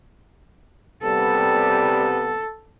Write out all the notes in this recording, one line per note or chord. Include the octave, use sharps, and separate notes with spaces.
C3 G3 B3 A4